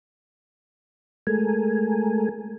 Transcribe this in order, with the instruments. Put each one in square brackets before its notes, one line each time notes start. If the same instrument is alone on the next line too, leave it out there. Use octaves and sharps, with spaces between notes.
[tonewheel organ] G#3 A3 A4 A#4 G#5